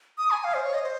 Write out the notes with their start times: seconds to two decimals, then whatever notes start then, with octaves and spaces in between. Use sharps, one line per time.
0.18 D#6
0.31 G#5
0.44 F5
0.54 C5
0.64 C#5
0.74 D#5
0.83 C5